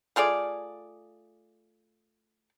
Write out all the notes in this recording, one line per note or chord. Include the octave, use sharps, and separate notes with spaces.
A3 F4 G#4 D5